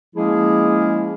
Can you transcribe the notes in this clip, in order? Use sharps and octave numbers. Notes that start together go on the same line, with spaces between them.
F3 G#3 A#3 C#4 E4 G#4